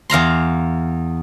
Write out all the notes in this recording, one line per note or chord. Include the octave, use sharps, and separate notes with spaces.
E2 F5 A#5 C6